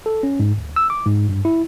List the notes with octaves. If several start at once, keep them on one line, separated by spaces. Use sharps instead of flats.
A4
C#4
G#2
D2
E6
D6
G#2
G2
E4